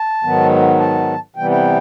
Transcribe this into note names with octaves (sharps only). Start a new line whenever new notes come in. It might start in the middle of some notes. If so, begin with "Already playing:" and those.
Already playing: A5
G#2 D#3 F#3 B3
A5
C3 E3 G3 B3 G5
G5